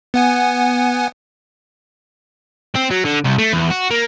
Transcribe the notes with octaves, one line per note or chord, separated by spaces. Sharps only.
B3 F#5 G#5
C4
F#3
D3
C2
A3
E2
F#4
A#3